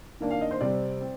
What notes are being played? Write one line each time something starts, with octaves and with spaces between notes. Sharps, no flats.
D#3 A#3 D4
F5
D#5
C5
C3 G3 C4 D5
C4